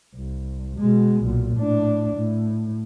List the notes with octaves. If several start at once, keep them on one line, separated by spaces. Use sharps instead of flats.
C2
B2 G#3
B1 A#2
A2 D4
A2